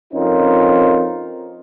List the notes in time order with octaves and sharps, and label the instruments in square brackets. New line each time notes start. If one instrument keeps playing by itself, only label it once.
[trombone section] F2 C4 C#4 D#4 F4 A#4